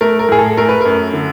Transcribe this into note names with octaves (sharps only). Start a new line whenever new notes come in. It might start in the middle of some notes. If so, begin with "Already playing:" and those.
A3 A#4
A#4
A2 G#4
A4
A3 A#4
B4
F#2 A#4
D3